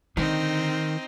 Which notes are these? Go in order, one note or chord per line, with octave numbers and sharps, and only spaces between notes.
D3 D#3 C4 D#4